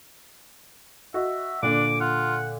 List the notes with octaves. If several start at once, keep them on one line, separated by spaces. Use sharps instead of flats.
F#4 D#5 E5
A#2 D3 D4 D6
F4 F#5